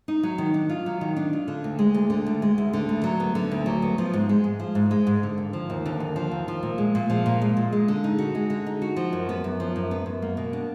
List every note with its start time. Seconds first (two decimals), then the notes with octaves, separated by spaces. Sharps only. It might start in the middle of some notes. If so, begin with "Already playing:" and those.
0.08 D#4
0.23 F#3
0.38 D#3
0.54 D4
0.70 F4
0.86 F#3
1.01 D#3
1.16 D4
1.33 F4
1.48 D3
1.64 D2
1.79 G#3
1.94 D2
2.10 D3
2.26 D2
2.42 G#3
2.58 D2
2.73 D3
2.89 D2
3.04 F#3
3.20 B3
3.35 D3
3.51 D2
3.66 F#3
3.82 B3
3.98 F3
4.13 G#2
4.29 G#3
4.44 G#2
4.60 F3
4.75 G#2
4.91 G#3
5.07 G#2
5.23 D3
5.38 D#2
5.53 F3
5.70 D#2
5.86 D3
6.00 D#2
6.16 F3
6.31 D#2
6.48 F3
6.63 A#2
6.78 G#3
6.95 A#2
7.10 F3
7.26 A#2
7.42 G#3
7.57 A#2
7.72 G#3
7.88 D3
8.04 D#4
8.18 F#4
8.35 G#3
8.50 D3
8.66 D#4
8.82 F#4
8.96 F3
9.13 F#2
9.29 B3
9.44 F#2
9.60 F3
9.76 F#2
9.91 B3
10.06 F#2
10.22 A#3
10.37 B2
10.53 D4